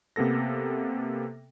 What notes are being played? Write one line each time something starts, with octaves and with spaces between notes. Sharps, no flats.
C3 A#3 B3 A4 A#6